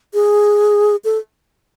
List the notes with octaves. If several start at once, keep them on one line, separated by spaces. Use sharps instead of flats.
G#4
A4